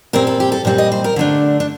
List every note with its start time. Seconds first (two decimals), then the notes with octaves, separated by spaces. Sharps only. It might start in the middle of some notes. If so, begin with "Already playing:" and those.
0.13 A#2 G3 C4 A#4
0.27 A4
0.40 G4
0.52 A4
0.65 A#2 G3 C4
0.78 D#5
0.92 C5
1.04 A#4
1.16 D3 A3 D4
1.60 D4